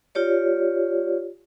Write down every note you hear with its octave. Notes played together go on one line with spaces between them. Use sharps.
F4 G4 C#5 D5